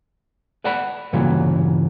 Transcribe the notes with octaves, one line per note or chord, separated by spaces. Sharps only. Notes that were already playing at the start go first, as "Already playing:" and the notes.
B4 D5 F#5 A5 B5
G2 A#2 C#3 E3 F#3